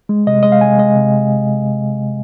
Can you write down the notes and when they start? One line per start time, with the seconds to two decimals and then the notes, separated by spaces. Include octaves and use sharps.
0.09 G#3
0.27 C3 D#5
0.43 G#3 D#5
0.52 F5
0.61 C3 G#5
0.78 G#3 D#5
0.96 C3